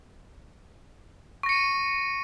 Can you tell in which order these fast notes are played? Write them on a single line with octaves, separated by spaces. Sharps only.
C#6 A#6 C#7 D#7